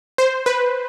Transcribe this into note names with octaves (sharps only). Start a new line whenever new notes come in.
C5
B4